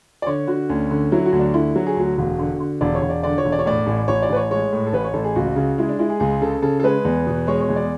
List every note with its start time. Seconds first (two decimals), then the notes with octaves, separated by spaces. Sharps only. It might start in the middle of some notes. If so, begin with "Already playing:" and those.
0.22 D5
0.26 D3 C#5
0.47 D3 F#4
0.69 D2 C#4
0.91 D3
1.12 F#3 E4
1.26 F#4
1.32 D2
1.39 D4
1.54 D3 E4
1.75 F#3 F#4
1.87 G#4
1.97 D2 F#4
2.18 E1
2.39 D3
2.60 D3
2.81 E1 D5
2.95 C#5
3.02 E1
3.09 D5
3.23 D3 D5
3.38 C#5
3.45 E1
3.52 D5
3.59 C#5
3.66 A2 D5
3.87 A1
4.08 A1 C#5
4.22 D5
4.30 A1 B4
4.36 C#5
4.50 G#3 C#5
4.72 A2
4.87 A4
4.93 A1 B4
5.04 C#5
5.14 A1 A4
5.24 G#4
5.35 C#2 F#4
5.56 C#3
5.78 G#3 E4
5.89 D4
5.99 G#3 E4
6.10 G#4
6.20 C#2 G#4
6.42 C#3 A4
6.62 C#3 A4
6.80 A4
6.83 G#3 B4
7.05 E2
7.27 B2
7.47 G#3 C#5
7.61 C#5
7.69 E2
7.76 D5